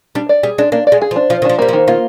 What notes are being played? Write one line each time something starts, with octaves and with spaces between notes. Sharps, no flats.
G3 D4
D5
G3 G#4
G#3 D4
A#3 D4
D5
G#3
G#4
F3
D4
F3 F4
D#3
F3 D4
G3 A#3
F3
D#3
A#3 F4